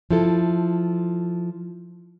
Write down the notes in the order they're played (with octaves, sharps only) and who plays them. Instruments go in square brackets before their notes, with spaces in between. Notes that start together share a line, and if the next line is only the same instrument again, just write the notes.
[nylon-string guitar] F3 E4 A4